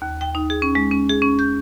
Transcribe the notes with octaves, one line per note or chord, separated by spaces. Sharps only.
D#2
G5
D#4
G#4
C#4
G#3
C#4
G#4
C#4
G6